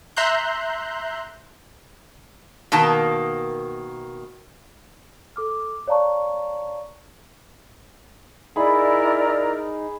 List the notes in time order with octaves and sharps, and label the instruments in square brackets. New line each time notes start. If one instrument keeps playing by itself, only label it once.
[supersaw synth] E5 A#5 C6 F#6 G6
[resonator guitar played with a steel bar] B2 D#3 A#3 A5
[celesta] A4 D6 F6
C#5 D5 F5 A5 A#5 C#6
[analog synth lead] D#4 [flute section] E4 D5 [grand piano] G#4 B5 [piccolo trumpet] A#4